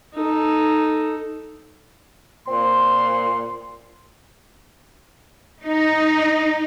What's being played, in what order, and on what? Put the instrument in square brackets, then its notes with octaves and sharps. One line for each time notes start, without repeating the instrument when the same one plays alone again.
[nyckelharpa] D#4 A4
[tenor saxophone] A#2 [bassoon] C4 [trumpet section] C6
[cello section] D#4